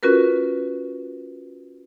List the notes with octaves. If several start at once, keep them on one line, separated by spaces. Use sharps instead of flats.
C#4 F4 F#4 A#4 B4